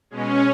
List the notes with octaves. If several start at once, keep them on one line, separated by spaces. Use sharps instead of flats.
B2 G#3 C#4